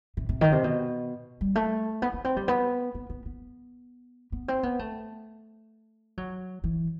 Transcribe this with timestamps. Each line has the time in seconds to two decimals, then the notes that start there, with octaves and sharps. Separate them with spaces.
0.17 C3
0.29 C3
0.41 D#3
0.52 C3
0.64 B2
1.41 G3
1.55 A3
2.02 B3
2.13 B3
2.25 C4
2.36 G3
2.48 B3
2.95 B3
3.09 B3
3.25 B3
4.32 B3
4.48 C4
4.63 B3
4.79 A3
6.17 F#3
6.64 E3